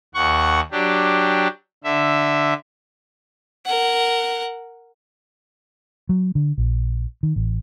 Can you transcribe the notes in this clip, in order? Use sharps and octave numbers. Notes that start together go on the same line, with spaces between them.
D#2 F#5 C#6
F#3 D4 G4
D3 E5
A#4 F#5
F#3
D3
A#1
D#3
A1